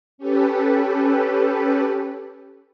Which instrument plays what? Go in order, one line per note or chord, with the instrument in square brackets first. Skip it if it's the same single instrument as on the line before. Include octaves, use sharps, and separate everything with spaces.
[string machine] C#4 G4 A4 B4